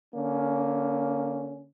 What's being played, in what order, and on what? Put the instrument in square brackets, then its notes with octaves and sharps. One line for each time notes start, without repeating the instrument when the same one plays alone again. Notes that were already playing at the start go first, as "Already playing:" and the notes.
[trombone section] D3 A#3 C#4